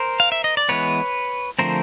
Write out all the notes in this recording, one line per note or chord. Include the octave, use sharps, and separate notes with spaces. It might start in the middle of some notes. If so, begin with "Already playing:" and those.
Already playing: A#4 C5
F5
E5
D#5
D5
E3 G#3 B3 B4 C#5
D3 F3 A3 C4 A#4 C5